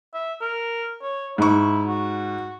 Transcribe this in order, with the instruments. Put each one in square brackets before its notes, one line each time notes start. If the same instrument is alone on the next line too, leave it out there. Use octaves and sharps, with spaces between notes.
[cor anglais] E5
A#4
C#5
[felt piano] G#2 C#6 [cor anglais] E4
[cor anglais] F#4